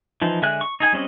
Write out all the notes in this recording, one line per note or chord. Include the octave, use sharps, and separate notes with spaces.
E3 F3 D#4
D3 G#3 E5 G#5 F#6
C#6
D#4 G#4 G#5
G3 C4 C#4 F#4 D#5